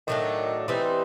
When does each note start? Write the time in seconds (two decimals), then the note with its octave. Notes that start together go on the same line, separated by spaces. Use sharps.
0.07 A2 D#3 F#3 A3 D4
0.68 E3 G3 C4 D#4